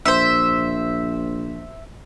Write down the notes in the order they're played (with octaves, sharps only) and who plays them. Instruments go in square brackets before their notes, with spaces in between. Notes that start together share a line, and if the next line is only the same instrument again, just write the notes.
[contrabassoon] A#1 [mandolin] C5 E5